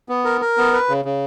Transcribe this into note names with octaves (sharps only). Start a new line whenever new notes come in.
B3
A#4
A#4
B3
B4
C#3
C#3